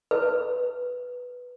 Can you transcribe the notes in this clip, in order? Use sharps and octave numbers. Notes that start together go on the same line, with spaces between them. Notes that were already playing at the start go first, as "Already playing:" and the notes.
B4